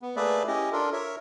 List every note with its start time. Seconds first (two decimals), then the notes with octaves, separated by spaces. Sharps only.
0.02 B3
0.16 A3 A#3 G#4 B4 D5 E5
0.47 C#4 E4 G4 D#5
0.72 D4 F4 A4 A#4
0.93 A#4 C#5 E5